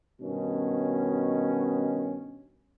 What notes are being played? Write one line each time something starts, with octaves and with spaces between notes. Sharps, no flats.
G2 B2 D#3 C#4